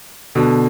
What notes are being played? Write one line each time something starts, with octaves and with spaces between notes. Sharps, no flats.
B2 D3